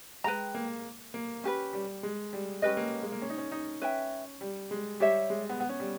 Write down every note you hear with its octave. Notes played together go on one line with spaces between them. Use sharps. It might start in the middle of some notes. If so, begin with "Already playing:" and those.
G#3 B4 G5 A#5
A#3
A#3
C#4 G4 B4
G3
G#3
G3
G#3 C#4 G4 B4 D#5
A#3
G#3
A#3
C#4
D#4
C#4
D#4
C#4 B4 E5 G5
G3
G#3
G3 G4 C#5 E5
G#3
B3
B3
C#4
G3